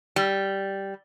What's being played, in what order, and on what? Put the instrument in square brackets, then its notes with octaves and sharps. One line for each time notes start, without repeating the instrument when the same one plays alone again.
[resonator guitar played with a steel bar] G3